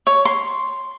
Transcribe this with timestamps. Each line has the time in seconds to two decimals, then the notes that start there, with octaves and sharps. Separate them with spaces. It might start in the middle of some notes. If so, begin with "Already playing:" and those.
0.07 C#5
0.25 C6